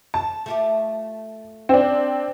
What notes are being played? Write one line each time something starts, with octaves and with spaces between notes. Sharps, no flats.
A5
A3 F4 G4
C4 D4